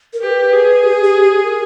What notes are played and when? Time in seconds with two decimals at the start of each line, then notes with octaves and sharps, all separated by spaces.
0.13 A#4
0.22 G4 B4
0.52 G#4
0.83 G4
1.03 G4
1.23 G4
1.44 A#4